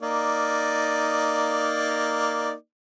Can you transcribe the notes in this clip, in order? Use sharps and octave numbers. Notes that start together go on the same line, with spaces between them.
A#3 D#4 D5